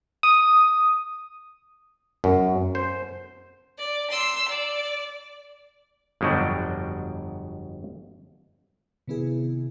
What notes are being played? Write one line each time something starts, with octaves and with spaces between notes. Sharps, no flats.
D#6
F#2
C5
D5
C6 E6
D5
G1 F2 B2 F#3 D5 G5
C3 D#3 B3 E4 G#4